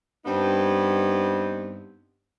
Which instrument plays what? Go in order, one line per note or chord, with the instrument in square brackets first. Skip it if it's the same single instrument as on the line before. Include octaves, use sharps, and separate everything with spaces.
[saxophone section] G2 B3 C4 D#4